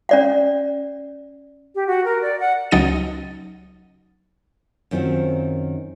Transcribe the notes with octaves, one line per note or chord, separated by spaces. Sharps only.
C#4 D5 F#5
G4
F#4
A#4
D5
F#5
C#2 F#3 D#4 A6 D#7
F#2 D#3 C4 F4 F#4